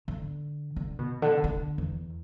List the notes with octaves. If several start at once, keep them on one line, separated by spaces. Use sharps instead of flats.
D3
D3
B2
D3
D3
E2